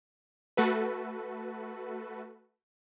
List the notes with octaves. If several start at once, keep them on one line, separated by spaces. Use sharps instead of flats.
A3 F#4 A4 B4